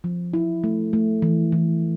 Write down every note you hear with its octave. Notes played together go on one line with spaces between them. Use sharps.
F3
E4
A3
A3
E3
E3